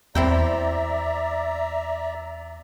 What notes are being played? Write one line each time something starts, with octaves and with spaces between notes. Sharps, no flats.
E2 C4 E4 D5 E5 G5 A#5